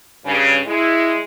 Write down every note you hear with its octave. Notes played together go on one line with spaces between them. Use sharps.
G2 C#3
G#3 E4